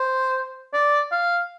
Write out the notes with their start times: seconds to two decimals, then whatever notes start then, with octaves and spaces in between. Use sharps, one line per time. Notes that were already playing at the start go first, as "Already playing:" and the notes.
Already playing: C5
0.73 D5
1.12 F5